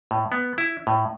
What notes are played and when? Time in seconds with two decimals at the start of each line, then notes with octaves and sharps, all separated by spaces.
0.11 A2
0.32 B3
0.58 E4
0.87 A2